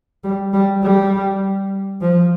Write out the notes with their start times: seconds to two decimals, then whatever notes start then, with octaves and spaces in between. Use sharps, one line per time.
0.24 G3
0.53 G3
0.83 G3
2.01 F3